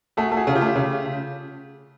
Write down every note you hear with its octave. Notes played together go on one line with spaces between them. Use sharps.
A3 F#4 G#4
A3
F#4 G#4
C#3
F4 G4
A3
C#3